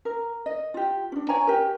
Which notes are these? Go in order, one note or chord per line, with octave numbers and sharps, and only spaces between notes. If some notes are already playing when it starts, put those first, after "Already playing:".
A#4
D#5
F4 G4
C#4 D4
C#5 G#5 A#5
G4 A#4